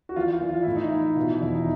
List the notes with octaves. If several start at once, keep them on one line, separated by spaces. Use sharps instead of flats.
F#4
E3 F4
F4
E3
F4
A2 E4
D#4
E3 E4
B2 F4
E4
E2 E4
D#4